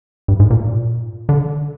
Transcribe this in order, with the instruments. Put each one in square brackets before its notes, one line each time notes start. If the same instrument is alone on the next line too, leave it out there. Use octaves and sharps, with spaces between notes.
[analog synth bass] G2
G#2
A#2
D3